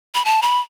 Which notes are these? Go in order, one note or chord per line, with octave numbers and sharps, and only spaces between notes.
B5
A5
B5